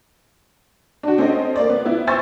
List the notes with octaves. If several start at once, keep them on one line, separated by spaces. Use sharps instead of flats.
D4 F#4
C4 C#4 A4 D#5
A#3 D5
B3
B3 E4
C5 E5 G#5 C#6 E6 A6